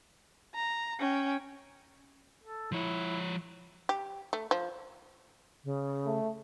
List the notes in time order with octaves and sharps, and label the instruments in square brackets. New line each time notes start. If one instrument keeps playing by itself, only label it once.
[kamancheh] A#5
C#4 G5
[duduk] A4
[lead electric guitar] F3 C#5 [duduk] E4
[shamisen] G4
A3
F3
[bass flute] C#3
[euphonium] A3